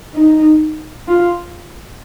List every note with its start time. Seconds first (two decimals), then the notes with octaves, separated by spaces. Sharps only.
0.15 D#4
1.08 F4